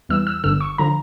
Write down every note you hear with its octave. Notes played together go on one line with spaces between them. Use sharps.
E2 E3 G3 E6
E6
G1 G2 D3 E6
C#6
D3 F3 A#5